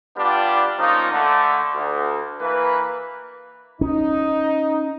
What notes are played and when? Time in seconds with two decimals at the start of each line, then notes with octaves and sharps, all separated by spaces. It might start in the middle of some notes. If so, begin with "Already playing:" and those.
0.17 G3 B3 D4 F4 G4
0.78 F3 A#3 C#4 D#4
1.12 D3 A3
1.74 D2
2.41 E3 A#3 B4
3.81 C#4 D#4